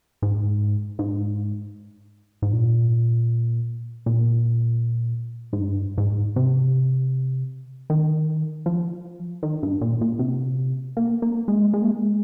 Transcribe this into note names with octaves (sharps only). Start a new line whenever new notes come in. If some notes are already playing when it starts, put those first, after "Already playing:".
G#2
G#2
G#2
A#2
A#2
G#2
G2
G#2
C3
D#3
F3
D#3
G2
A#2
A#2
C3
A#3
A#3
G#3
G#3
A#3
G#3